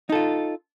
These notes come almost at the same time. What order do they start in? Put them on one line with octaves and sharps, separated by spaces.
D#4 A4 F4